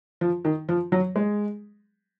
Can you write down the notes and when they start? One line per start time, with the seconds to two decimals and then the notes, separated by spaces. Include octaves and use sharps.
0.21 F3
0.45 D#3
0.69 F3
0.92 F#3
1.16 G#3